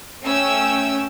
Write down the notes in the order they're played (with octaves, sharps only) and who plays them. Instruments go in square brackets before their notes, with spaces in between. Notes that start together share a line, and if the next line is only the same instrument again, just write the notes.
[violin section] A3 C#4 G5 E6